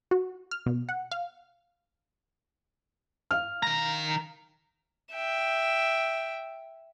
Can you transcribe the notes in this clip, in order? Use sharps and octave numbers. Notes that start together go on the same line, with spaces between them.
F#4
F6
B2
F#5
F5
F5 F6
D#3 A#5
E5 G5